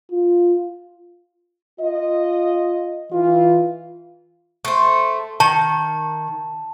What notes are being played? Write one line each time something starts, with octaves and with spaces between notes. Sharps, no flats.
F4
F4 D#5
E3 F4
A3 C5
D#3 A5